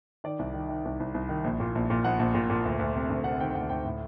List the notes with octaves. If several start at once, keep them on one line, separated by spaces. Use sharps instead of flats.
D#3 D5
C2
D#3
D#3
C2
C2
C2
D#3
A#1
A#2
A#1
A#2
A#1 F#5
A#1
A#2
A#2
D2
D2
C3
D2
C3 F#5
D#3 G5
D2 F#5
D2 G5
A2